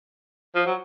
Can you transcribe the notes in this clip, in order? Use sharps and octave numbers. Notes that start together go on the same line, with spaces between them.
F3
F#3